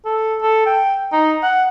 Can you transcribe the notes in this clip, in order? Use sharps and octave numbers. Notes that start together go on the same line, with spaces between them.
A4
A4
G5
D#4
F#5